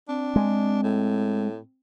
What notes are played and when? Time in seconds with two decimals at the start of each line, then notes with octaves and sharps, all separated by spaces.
0.08 C4 D4
0.36 G#3
0.83 A2